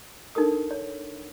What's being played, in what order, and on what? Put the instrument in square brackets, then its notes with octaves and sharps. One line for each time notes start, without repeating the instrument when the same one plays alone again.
[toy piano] D4 D#4 A4 A#4 D#6
C#5